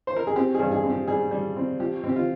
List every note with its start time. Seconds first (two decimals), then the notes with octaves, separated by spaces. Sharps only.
0.07 C5
0.16 A#4
0.27 G#4
0.36 C4 G4
0.54 G2 G#4
0.72 G#4
0.83 C4
0.90 G4
1.07 G3 G#4
1.31 G3
1.56 C4
1.79 F3 G4
2.04 C4
2.09 G4
2.16 F4